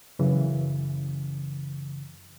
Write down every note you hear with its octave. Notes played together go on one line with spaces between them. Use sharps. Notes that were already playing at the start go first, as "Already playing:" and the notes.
F#2 C#3 E3